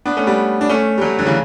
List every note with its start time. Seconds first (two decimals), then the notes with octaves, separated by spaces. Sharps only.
0.05 B3 D4
0.17 A3 C#4
0.27 G3 B3
0.61 D4
0.69 A3 C#4
0.98 G3
1.01 F#3 A3
1.19 D3 F#3
1.26 C#3 E3